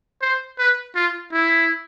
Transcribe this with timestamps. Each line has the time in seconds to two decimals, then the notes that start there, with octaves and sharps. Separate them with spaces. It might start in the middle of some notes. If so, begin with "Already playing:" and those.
0.21 C5
0.59 B4
0.95 F4
1.33 E4